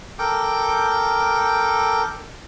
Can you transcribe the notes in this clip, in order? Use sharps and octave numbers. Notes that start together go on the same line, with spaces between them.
A4 A#4 G5 D6